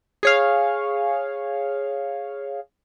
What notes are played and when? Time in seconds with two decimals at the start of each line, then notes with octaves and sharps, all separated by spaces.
0.23 G#4 C#5 F5